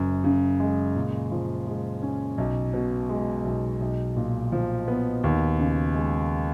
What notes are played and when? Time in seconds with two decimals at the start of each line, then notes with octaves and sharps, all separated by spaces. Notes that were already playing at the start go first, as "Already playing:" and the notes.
Already playing: F#1 F#2
0.24 C#3
0.60 G#3
0.96 A#2
1.31 F3
1.67 G#3
2.03 C#4
2.38 B1
2.74 B2
3.09 G#3
3.45 B1
3.80 B1
4.16 A#2
4.52 F3
4.88 B3
5.24 D#2
5.59 C#3
5.95 G#3